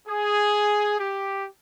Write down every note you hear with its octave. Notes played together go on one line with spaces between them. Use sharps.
G#4
G4